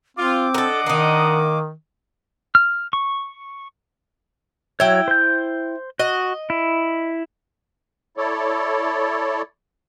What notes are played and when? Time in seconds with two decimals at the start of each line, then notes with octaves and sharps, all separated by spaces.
0.17 C4 F4 D6
0.54 D4 A4 A#4 D#5 F#5
0.86 D#3 A#3 D#4
2.55 F6
2.93 C#6
4.80 F#3 E4 C#5 G5
5.08 C5 G6
5.99 F#4 D#5
6.50 E4
8.17 E4 A4 C#5 D5